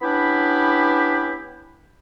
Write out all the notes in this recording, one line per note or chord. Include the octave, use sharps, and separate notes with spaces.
B3 C#4 D4 E4 G4 B5